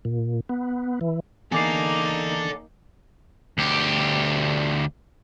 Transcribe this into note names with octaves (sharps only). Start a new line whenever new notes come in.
A#2
B3
E3
E2 A#3 D#4 A4 D5 G#5 D6 C7
D2 G4